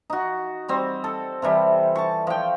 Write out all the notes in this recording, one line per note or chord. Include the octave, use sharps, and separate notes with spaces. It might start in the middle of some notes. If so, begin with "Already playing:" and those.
D#4 F#4
G3 C4
A4
C3 E3 G3
A5 C#6
F3 G5